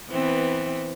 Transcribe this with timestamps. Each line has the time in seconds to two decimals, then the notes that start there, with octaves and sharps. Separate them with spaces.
0.10 E3 B3 C4